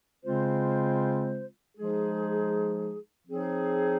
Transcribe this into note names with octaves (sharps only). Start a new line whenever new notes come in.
C#3 G#3 C4 F4 C5
F3 G#3 D#4 G#4
F3 C4 D#4 G#4 C#5